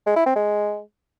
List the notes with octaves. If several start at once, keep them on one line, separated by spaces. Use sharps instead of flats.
G#3
E4
C4
G#3